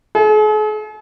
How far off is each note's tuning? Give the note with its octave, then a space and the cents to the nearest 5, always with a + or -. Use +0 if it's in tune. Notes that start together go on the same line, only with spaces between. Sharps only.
G#4 +45